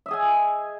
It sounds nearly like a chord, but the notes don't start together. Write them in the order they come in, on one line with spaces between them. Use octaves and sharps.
E5 D#5 G#4 G#5